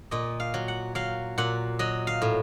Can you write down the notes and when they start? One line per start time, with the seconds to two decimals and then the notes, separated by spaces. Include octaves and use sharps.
0.11 A#2 D#5
0.40 F5
0.54 F#3
0.68 F#5
0.95 F#3 F5
1.38 A#2 F#5
1.79 F#3 D#5
2.07 F5
2.22 A2